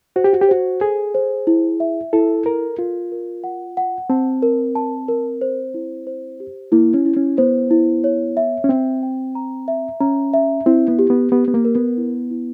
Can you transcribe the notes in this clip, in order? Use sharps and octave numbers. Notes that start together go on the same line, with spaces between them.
F#4 C5
G4
F#4
G4
F#4 C5
G#4 A4
C5
E4
E5
E4 A4
A4 A#4
F4 A#4
A#4
F#5
F#5
C4 A5
A#4
A5
A#4
C5
E4
C5
G4
A#3 E4
C#4
E4
C#4
B3 C5
E4
C#5
E5
C#4
C4 G5
G5
A#5
E5
C#4 A#5
E5
C4 E4
B3
G4
B3
B3 G4
B3
A#3
A#4
B3
E4
E4